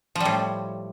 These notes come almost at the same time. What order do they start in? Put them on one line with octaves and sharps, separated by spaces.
F3 G3 A2